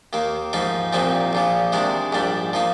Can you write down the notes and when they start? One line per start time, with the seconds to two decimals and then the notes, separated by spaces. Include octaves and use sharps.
0.13 D#2 D#3 A#3
0.53 G#2 F3 A#3 D#4
0.93 C2 A#2 F3 C4 D#4
1.33 A#1 A#2 F3
1.72 C3 D#3 G#3 D4
2.12 A#1 G#2 G3 D4
2.53 F3 A#3 D#4